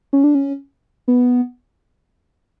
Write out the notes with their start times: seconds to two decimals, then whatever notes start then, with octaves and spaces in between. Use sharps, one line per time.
0.13 C#4
0.24 D4
0.35 C#4
1.08 B3